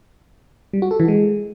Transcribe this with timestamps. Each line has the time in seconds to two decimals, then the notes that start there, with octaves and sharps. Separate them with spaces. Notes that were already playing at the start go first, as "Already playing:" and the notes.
0.73 G3
0.82 F#4
0.91 A4
1.00 E3
1.08 G#3